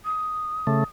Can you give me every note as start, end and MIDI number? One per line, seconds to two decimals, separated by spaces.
0.05 0.84 87
0.67 0.84 49
0.67 0.84 57